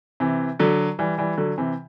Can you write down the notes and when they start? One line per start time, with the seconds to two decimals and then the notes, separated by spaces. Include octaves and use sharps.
0.20 C3 E3
0.59 D3 F#3
0.99 E3 G3
1.18 E3 G3
1.37 D3 F#3
1.58 C3 E3